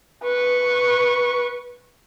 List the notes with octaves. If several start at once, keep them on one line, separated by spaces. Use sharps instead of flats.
B4 C#6